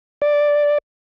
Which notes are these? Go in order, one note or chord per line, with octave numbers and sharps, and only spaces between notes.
D5